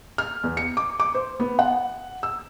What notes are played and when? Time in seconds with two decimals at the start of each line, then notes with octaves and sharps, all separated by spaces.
0.18 F6
0.44 E2
0.57 C#7
0.77 D6
1.00 D6
1.15 C5
1.40 B3
1.59 F#5
2.23 E6